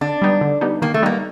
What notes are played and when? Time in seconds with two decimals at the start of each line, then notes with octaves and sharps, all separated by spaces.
0.01 D3 D4
0.22 G3 B3 D#4
0.41 D3
0.61 G3 B3 D#4
0.82 D#3 A#3
0.94 A3
1.03 G3 A#3 B3 D#4